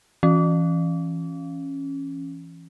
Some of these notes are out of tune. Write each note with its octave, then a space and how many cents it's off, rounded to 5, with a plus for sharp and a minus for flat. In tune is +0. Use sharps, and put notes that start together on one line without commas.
E3 +15 C#4 -10